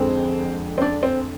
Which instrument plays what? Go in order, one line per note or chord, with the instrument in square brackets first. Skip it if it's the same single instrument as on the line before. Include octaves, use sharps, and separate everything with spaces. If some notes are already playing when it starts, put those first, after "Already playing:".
Already playing: [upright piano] F2 D3 G#3 [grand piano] C4
[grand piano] C4
D4
C4